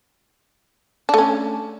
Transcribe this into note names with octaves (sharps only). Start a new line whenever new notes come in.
A3 C#4 D4